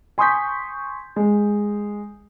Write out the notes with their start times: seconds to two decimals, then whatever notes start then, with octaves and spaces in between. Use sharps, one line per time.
0.18 G#5 C6 C#6 D#6 G6 B6
1.16 G#3